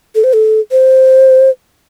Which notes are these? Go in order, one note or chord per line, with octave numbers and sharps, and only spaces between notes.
A4
C5
A4
C5